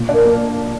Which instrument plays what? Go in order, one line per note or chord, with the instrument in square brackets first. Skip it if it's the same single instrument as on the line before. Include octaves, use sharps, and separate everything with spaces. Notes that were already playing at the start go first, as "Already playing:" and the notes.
Already playing: [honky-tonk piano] A#2
[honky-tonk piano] D4 [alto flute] A#4
[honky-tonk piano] A#3